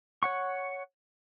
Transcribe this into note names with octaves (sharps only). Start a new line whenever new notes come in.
C#5 F#5 C#6